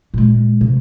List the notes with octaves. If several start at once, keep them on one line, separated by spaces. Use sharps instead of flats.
A#2 G#3
C3